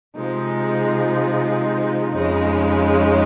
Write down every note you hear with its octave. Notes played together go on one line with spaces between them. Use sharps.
C3 F3 G#3 D#4
F2 C#3 G#3 D#4